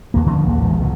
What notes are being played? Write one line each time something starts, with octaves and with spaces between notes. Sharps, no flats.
D#2 A#3
D3 D#3 F3 C#4
A#1 D#2 A#3
A1 E2 B2 G#3
C#2 B2 F#3